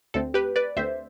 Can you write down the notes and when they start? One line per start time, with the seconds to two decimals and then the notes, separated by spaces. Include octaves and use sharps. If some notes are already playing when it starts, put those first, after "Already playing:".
0.14 D2 D3 A3 C4 A4
0.34 G4 B4
0.56 B4 D5
0.77 D2 D3 A3 C4 C5 E5